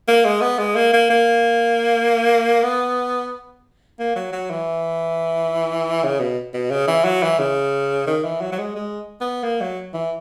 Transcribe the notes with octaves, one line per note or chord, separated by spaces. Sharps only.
A#3
G#3
B3
G#3
A#3
A#3
A#3
B3
A#3
F#3
F#3
E3
C#3
B2
B2
C#3
E3
F#3
E3
C#3
D#3
E3
F#3
F#3
G#3
G#3
B3
A#3
F#3
E3